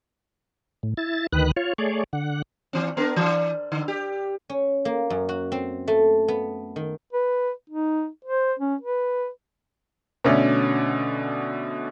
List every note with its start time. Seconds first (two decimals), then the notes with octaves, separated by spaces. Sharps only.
0.83 A2
0.97 E4 A6
1.33 D2 D#3 B4 F#6
1.57 F4 C#5
1.78 A3 G#4 C#5 D5
2.13 D3 F#5
2.73 E3 C4
2.97 B3 D4 A#4
3.16 E3
3.72 D3
3.88 G4
4.49 C#4
4.85 A#3
5.10 F#2
5.29 F#4
5.52 C4
5.88 A3
6.28 B3
6.76 D#3
7.13 B4
7.70 D#4
8.25 C5
8.59 C#4
8.81 B4
10.24 B2 D3 A3 C#4 D5